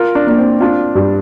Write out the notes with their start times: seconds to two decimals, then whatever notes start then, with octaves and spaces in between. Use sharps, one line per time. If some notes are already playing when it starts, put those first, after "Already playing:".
Already playing: F4 A#4
0.15 D4
0.27 A#3 D4
0.38 C4
0.61 D4 F4
0.95 G2